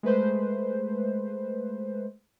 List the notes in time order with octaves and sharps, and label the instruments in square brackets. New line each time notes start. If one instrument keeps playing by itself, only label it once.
[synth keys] G#3 A3 B4 C5